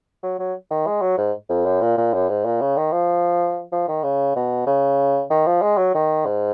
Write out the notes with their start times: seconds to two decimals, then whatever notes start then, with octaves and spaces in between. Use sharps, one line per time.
0.23 F#3
0.39 F#3
0.71 D#3
0.87 G#3
1.02 F#3
1.18 G#2
1.50 F2
1.66 F#2
1.82 A#2
1.97 A#2
2.14 F#2
2.29 G#2
2.45 A#2
2.61 C#3
2.77 D#3
2.92 F3
3.72 F3
3.88 D#3
4.04 C#3
4.36 B2
4.67 C#3
5.30 D#3
5.47 F3
5.62 G#3
5.78 F#3
5.95 D#3
6.26 G#2